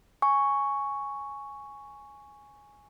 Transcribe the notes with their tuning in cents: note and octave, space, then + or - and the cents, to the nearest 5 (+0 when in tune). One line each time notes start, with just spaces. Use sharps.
G#5 +0 C#6 +0